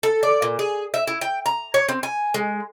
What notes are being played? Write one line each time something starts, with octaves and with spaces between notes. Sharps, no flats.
A4
D5
A#2
G#4
E5
E4
G5
A#5
C#5
C4
G#5
G#3